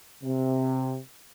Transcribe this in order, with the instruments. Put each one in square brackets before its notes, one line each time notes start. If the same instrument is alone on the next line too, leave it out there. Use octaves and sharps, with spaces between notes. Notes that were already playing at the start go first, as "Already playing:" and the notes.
[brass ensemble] C3